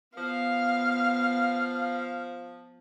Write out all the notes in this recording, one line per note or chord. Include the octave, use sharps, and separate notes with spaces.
F3 B3 F5